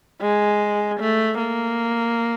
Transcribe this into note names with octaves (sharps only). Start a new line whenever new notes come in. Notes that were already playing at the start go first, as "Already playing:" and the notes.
G#3
A3
A#3